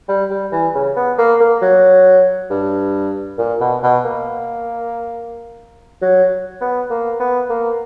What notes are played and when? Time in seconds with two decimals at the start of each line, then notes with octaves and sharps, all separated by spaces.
0.08 G3
0.30 G3
0.52 E3
0.74 C#3
0.96 B3
1.18 A#3
1.40 A#3
1.62 F#3
2.50 G2
3.38 A#2
3.61 B2
3.83 B2
4.04 A#3
6.02 F#3
6.61 B3
6.90 A#3
7.20 B3
7.50 A#3